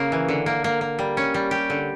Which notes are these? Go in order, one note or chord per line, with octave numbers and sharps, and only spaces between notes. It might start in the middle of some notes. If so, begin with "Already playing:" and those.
Already playing: C#3 A#3 C#4
E3
D3
A#3
A#3
A#3
G3
C#4
G3
G4
D3